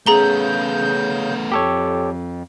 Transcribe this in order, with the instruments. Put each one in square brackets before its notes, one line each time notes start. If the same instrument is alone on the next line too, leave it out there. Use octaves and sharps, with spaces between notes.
[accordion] C#3 G6 [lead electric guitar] A3 B3 [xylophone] G#4 A#5 G7
[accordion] F2 [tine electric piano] G4 A4 C#5